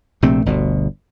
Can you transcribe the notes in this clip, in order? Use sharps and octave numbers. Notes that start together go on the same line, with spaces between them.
A#1 C3 A3 C4
G1 D2 B2